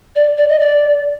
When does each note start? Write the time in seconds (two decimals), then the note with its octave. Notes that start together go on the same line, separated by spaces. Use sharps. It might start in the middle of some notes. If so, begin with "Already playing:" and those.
0.16 D5
0.38 D5
0.49 D#5
0.59 D5